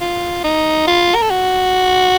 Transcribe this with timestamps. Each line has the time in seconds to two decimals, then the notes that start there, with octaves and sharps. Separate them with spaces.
0.01 F4
0.44 D#4
0.87 F4
1.15 A#4
1.22 A4
1.30 F#4